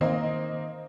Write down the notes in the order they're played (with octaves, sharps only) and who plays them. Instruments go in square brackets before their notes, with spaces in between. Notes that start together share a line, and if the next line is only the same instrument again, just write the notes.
[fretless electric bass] D#3 [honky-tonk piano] A#3 C4 D#5